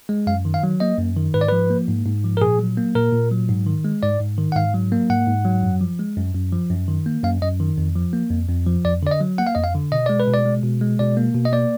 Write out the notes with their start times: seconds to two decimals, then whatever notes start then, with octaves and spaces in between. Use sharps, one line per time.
0.09 G#3
0.27 F#2 F5
0.45 D#3
0.54 F5
0.63 F#3
0.80 A#3 D#5
0.99 F#2
1.16 D#3
1.34 G#2 B4
1.41 D5
1.49 F3 B4
1.70 A#3
1.88 G#2
2.06 G#2
2.24 F3
2.37 A#4
2.41 A#2 G#4
2.59 F#3
2.77 A#3
2.95 A#2 A#4
3.13 A#2
3.31 F#3
3.49 G#2
3.67 D#3
3.85 G#3
4.02 G#2 D5
4.20 G#2
4.38 D#3
4.52 F#5
4.56 G#2 F5
4.74 F#3
4.92 A#3
5.10 G#2 F#5
5.28 G#2
5.45 F#3
5.63 F#2
5.81 F3
5.99 G#3
6.17 F#2
6.34 F#2
6.53 F3
6.70 F#2
6.88 D#3
7.06 A#3
7.23 F#2 F5
7.42 F#2 D#5
7.60 D#3
7.78 F2
7.96 F3
8.13 A#3
8.31 F2
8.49 F2
8.66 F3
8.85 F2 D5
9.03 D3 D5
9.11 D#5
9.21 F#3
9.38 A#3 F#5
9.47 F5
9.55 F2 D#5
9.64 F5
9.75 D3
9.92 B2 D#5
10.06 G#3 D5
10.20 B4
10.28 B2
10.34 D5
10.46 G#3
10.63 B2
10.81 G#3
10.99 B2 D5
11.17 A#3
11.35 B2
11.45 D#5
11.53 A#3 D5